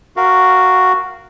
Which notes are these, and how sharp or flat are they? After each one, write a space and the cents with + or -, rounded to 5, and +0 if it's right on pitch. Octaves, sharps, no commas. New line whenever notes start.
F#4 +0 A#4 +0 F5 -15